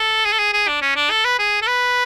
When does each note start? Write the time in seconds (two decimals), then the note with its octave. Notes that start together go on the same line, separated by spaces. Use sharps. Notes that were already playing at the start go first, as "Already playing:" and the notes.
Already playing: A4
0.25 G#4
0.32 A4
0.39 G#4
0.53 G#4
0.68 D4
0.82 C#4
0.96 D4
1.11 A4
1.25 B4
1.39 G#4
1.62 A4
1.68 B4